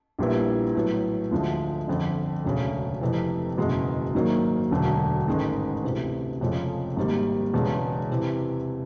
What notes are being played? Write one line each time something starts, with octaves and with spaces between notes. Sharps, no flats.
A#1 A#2 G3 B3 E4
A2 F#3 B3
D2 D3 F3 G#3
G1 F2 D3
E1 D2 C#3
F1 F2 C3 E3
F#1 E2 B2 G#3
G#2 D#3 F#3 A#3
E1 D2 D3 F#3
A1 G#2 D#3 G#3
D2 C3 E3
F1 F2 C#3 F3 G#3
G#1 G#2 D#3 G3 A#3
E1 E2 C#3 E3 G#3
C3 E3